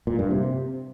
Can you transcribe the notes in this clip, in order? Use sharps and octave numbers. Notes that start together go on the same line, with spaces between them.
A#2
G2
C3